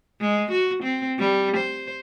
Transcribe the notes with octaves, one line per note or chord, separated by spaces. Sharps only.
G#3
F#4
C4
G3
C5